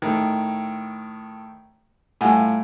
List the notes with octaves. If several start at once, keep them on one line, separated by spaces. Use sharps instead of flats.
A2 D#3
A2 G3 F4 F#5 G#5